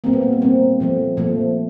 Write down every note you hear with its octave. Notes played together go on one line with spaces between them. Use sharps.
A#2 G3 A#3 C4
B3
A#3
B3
A#2 G3 A#3 C4
A#2 F3 A3
A#2 F3 A3